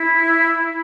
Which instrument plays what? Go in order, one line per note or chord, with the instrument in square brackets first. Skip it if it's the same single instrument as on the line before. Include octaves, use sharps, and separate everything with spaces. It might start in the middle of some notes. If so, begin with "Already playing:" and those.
Already playing: [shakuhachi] E4